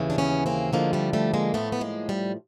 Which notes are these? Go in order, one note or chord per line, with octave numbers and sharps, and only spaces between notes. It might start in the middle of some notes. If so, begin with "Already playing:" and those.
Already playing: D#2 C#3 E3
D4
B3 C#4
A#3 C4
D2 D3 F3 G#3 A#3
G3 A3
G3 A3
G#3 A#3
A2 F3 A3 B3
B3
G#3 A#3
G3